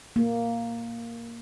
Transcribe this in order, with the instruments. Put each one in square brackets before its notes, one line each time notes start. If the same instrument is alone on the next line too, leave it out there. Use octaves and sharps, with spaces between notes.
[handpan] A#3